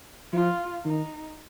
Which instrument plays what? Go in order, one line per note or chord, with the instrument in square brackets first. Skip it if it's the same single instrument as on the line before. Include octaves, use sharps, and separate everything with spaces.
[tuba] F3 [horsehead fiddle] F4
[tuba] D#3 [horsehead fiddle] D#4